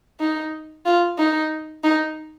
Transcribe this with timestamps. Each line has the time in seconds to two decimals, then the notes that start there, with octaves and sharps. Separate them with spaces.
0.20 D#4
0.86 F4
1.18 D#4
1.84 D#4